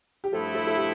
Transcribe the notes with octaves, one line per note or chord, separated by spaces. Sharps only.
G4
G2 F3 A3 E4 A4
A4
A4
G4